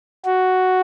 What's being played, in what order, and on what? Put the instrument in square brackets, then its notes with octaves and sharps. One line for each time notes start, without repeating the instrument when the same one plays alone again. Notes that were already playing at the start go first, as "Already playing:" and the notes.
[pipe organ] F#4